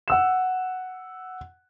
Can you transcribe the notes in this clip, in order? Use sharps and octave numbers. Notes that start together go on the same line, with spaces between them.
F#5 E6 E7